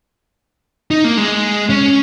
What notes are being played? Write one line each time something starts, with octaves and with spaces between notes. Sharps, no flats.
D#4
A#3
G#3
C#4